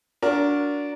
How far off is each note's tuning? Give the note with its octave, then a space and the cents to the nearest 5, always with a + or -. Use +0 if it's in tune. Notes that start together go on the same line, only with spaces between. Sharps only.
D4 -20 F#4 -25 A#4 +0